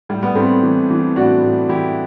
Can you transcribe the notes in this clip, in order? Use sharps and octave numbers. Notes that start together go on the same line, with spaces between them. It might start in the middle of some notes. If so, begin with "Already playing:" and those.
A2 G3
G3 B3
A2 A3 C4
E3
E3
A2 D4 F#4
A2
E3 E4 G4